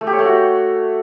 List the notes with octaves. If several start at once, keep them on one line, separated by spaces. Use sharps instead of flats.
A3
G4
C#5
A3
F#4